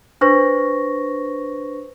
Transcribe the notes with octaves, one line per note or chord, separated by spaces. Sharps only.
D4 B4 C5 C#6 A#6